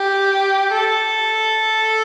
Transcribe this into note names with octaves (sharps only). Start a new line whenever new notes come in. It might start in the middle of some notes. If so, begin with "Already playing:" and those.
Already playing: G4
A4